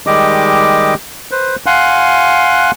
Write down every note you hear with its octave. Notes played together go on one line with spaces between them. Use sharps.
D#3 G3 G#3 G4 D#5 D6
B4 C5
F5 F#5 G#5 C6 F#6